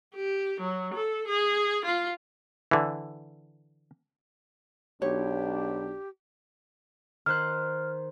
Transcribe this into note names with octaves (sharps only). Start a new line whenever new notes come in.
G4
F#3
A4
G#4
F4
D3 E3
B1 D4 G4 C#5
D#3 C5 F6 F#6